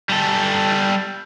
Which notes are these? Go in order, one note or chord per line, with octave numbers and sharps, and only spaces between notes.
G3 A4